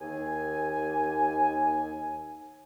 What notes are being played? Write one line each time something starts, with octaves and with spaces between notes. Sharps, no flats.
D#2 G#5